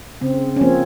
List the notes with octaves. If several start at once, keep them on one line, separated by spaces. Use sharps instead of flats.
C#3 C4
C#4
F3 A#3 C4